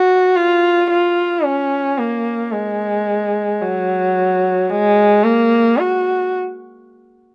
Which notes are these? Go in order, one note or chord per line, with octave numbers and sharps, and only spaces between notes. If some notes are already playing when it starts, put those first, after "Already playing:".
Already playing: F#4
F4
F4
C#4
A#3
G#3
F#3
G#3
A#3
F#4